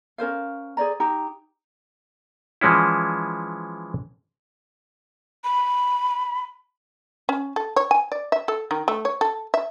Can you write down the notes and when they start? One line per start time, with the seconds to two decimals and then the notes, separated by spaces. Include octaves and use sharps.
0.18 C#4 A#4 C5 F5
0.77 G#4 C5 D5 A#5
1.00 D#4 G4 A#5
2.61 E3 F3 G#3 C#4 E4
5.44 B5
7.29 C#4
7.56 A4
7.76 C#5
7.91 G#5
8.12 D5
8.32 E5
8.48 A4
8.71 D#3
8.88 A3
9.05 C#5
9.21 A4
9.54 E5